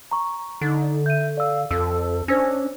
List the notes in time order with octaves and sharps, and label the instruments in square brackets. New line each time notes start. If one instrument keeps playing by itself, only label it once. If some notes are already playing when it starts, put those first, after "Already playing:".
[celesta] A#5 C#6
[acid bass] D3 [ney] D#4
[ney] E5 [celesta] G6 D#7
[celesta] D5 E6 [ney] F5
[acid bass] F2 [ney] A4 [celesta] E6
[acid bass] C#4 [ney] D4 [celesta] C5 E6 A#6